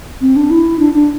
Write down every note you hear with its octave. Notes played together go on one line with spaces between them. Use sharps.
C4
D4
E4
D4
D4